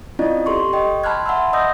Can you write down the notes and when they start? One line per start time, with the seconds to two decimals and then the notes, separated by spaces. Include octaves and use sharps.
0.19 C4 C#4 E4 F4 D5 D#5
0.46 G4 A4 C6 C#6
0.73 D#5 G5 C#6
1.04 A5 B5 C6 F6 F#6 G#6
1.26 E5 F#5 A5 B5 C6 E6
1.53 D#5 D#6 E6 G6 A#6